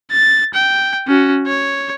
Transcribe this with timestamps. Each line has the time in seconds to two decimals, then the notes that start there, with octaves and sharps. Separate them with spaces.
0.11 A6
0.54 G5
1.08 C#4 F#4
1.47 C#5